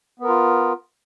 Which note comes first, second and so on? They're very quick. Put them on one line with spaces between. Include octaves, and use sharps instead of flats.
B3 A#4 F4